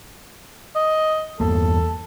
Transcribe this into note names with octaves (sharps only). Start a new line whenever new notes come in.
D#5
E2 G2 A#3 A4